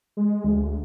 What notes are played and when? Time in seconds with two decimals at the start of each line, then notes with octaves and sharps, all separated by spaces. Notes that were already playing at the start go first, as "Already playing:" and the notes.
0.17 G#3
0.44 D2